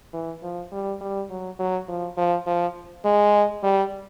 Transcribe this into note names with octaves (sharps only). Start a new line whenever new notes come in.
E3
F3
G3
G3
F#3
F#3
F3
F3
F3
G#3
G3